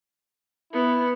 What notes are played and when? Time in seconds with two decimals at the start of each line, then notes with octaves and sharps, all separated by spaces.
0.73 B3 E4